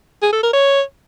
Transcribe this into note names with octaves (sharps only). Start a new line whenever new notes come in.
G#4
A4
A#4
C#5